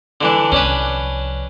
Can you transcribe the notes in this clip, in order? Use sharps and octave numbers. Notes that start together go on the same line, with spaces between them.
D3 E3 D4
C2 F3 C#4 D4 B4